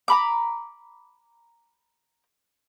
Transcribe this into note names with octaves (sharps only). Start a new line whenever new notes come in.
A#5 B5 D6